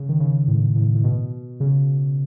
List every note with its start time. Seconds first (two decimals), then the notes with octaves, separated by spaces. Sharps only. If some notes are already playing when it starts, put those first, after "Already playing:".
Already playing: C#3
0.09 D#3
0.20 C#3
0.48 A2
0.76 A2
0.95 A2
1.04 B2
1.60 C#3